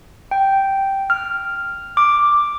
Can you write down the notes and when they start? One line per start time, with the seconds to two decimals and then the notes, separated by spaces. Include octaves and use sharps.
0.31 G5
1.10 F6
1.97 D6